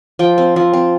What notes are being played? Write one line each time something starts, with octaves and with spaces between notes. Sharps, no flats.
F3 G5
C4
F3
C4